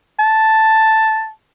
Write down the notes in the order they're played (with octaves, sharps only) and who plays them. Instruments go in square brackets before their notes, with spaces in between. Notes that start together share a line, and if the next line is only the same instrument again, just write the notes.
[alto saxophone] A5